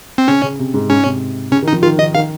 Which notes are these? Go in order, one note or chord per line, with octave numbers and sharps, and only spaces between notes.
C4
C#3 C#4
C#3
C3
G#2
G#2 C#4
C3
C#3 C#4
D#3
D#4
F3
D#3 F4
D#3 D#5
D#3 F5